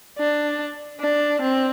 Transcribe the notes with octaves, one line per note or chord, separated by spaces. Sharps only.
D4
D4
C4